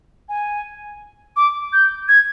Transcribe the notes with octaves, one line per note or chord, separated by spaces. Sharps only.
G#5
D6
G6
G#6